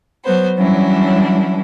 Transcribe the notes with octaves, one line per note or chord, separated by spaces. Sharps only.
F#3 B3 C5
E3 F#3 G3 C#4 D4 E4